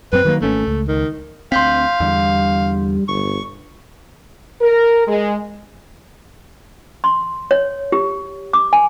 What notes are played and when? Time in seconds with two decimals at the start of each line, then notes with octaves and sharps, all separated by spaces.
0.13 F#2 C4 B4
0.25 D#3 F#3 A#3
0.42 G#1 A3 A#3 C#4
0.67 C#2
0.88 D#3
1.52 D2 C4 F5 C6 G6 B6
2.00 E2 D3 G3
3.08 G1 C#6
4.61 A#4
5.08 G#3
7.04 C6
7.51 C#5
7.92 G4
8.53 D6
8.73 G#5